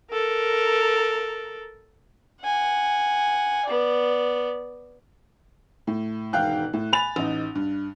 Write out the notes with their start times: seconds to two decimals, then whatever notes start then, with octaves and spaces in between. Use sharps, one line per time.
0.12 A4 A#4
2.43 F#5 G#5
3.66 B3 D5
5.87 A2
6.33 E1 G#2 D#3 F5 G5 F#6
6.73 A2
6.92 G#5 B5 A6 F7
7.16 A1 D#4
7.55 G2